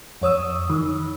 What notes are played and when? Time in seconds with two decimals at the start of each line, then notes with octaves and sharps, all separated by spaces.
0.22 F2 C#5 D#6 E6
0.70 D#3